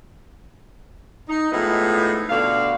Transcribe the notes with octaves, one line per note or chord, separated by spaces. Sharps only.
D#4
A2 F3 G#3 B3 D#4 E4
B2 D3 D4 F5